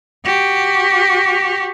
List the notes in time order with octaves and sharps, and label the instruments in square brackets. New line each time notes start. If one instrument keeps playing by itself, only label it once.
[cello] F#4 G4